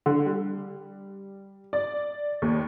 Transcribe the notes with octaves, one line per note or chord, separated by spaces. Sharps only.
D3
G3
D5
D#2